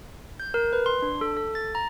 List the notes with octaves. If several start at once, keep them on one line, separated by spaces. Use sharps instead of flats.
G6
A#4
B4
C6
D4
A4
A4
A6
A#5